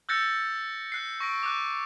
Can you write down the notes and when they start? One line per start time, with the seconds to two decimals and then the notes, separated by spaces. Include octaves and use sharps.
0.09 E6 F#6 G6 A6 A#6 C#7
0.92 F#6 C7
1.20 C#6 A#6 D7
1.43 D6 F#6